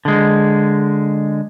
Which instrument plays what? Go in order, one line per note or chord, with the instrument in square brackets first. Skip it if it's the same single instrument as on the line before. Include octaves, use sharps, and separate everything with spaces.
[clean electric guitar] D3 G#3